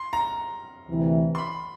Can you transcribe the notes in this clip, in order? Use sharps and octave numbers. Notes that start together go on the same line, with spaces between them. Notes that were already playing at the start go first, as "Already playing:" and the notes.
Already playing: C6
A#5
D2 C3 E3
C6
B5